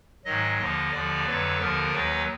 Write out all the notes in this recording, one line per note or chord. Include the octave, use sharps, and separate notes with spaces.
G#2 D#3 F#3 D#5
D#2 D3 F3 D#5
D#2 D3 F3 D5
F2 D3 F#3 B4
D#2 D3 F3 A#4
D#2 D#3 F#3 B4